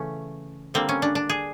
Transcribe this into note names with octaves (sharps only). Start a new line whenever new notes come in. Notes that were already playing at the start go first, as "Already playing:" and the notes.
Already playing: C#3 E3 A3 C#4
D3 G3 A#3 C4
C#4
D4
D4
G#4